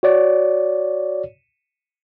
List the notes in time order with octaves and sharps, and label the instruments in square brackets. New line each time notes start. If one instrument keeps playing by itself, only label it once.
[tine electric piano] F#4 C#5 D5